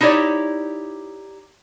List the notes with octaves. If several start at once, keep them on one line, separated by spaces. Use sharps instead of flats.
D#4 E4 G4 C#5 D5